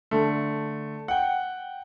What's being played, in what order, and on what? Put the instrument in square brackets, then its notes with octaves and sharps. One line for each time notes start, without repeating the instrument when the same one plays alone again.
[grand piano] D3 A3
F#5 G5